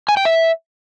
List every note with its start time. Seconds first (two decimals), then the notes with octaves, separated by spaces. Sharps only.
0.09 G#5
0.17 G5
0.25 E5